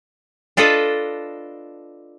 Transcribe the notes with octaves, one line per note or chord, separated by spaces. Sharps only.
D4 F4 A4 B4 D#5